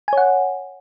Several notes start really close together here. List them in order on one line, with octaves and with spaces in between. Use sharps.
G#5 C#5 F#5